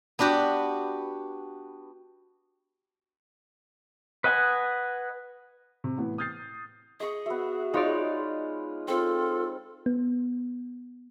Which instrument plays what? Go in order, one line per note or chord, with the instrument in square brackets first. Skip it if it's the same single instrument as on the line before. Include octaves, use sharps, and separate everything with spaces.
[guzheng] B3 D4 F#4 G4 B4
[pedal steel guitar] B4 D#5 F#5 G#5
[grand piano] C3
A2 E3 B3 E4
D#6 F6 G6 A6 C7
[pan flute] G#4 [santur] D#5 C#6
[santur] B3 E5 [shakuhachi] F#4
[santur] G#3 F4 B4 [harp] D#4 C#5 D5
[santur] C4 [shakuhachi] F4 [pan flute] A4
[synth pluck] B3